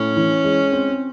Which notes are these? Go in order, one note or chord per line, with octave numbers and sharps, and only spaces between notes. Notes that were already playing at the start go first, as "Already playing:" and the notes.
Already playing: A2 C#4
E3
G#3
C4